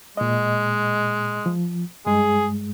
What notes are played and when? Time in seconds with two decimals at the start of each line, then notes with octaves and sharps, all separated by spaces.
0.17 A#2 G#3 D#5
1.46 F3
2.06 G2 G#3 G#4